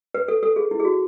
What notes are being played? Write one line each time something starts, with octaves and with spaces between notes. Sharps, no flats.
B4
A4
A4
G#4
E4
G#4
F#4